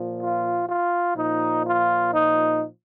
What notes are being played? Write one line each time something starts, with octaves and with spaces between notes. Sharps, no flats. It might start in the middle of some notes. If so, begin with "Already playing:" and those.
Already playing: A#2 F3
F4
F4
A#2 F3 D#4
F4
D#4